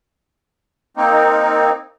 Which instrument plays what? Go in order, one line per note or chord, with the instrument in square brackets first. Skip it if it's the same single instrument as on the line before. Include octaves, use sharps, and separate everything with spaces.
[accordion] A#3 C4 D#4